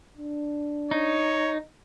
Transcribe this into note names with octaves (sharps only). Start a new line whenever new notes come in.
D4
D#4 C#5